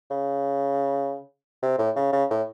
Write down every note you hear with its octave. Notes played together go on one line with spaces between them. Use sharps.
C#3
C3
A2
C#3
C#3
A2